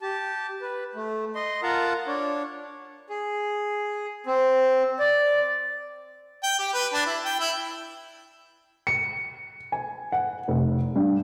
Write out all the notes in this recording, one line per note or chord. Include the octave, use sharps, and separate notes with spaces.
G4 A5
B4
A3
D#5 C6
F4 A#4 F#5 A5 A#5
D4 C#5
G#4
C4
D5
G5
G4
B4
D4
E4
G5
E4
C#7
G#5
F#5
F1
G2